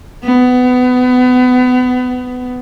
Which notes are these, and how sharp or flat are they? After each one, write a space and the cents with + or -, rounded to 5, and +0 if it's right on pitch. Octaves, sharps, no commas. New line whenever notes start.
B3 +25